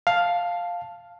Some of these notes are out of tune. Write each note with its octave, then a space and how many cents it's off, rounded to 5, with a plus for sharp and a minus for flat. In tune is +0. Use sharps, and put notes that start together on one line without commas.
F5 +5 A5 +0